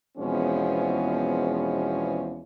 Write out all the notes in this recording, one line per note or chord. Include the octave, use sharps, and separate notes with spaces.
E2 B2 F3 G#3 C4 C#4